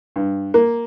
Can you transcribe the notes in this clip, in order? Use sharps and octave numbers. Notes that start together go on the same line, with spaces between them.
G2
A#3